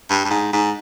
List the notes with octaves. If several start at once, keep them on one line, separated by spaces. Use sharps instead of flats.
G2
G2
G#2
G#2